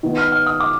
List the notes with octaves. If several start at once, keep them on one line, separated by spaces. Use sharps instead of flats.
D#3 B3
F6
F6
D#6
D6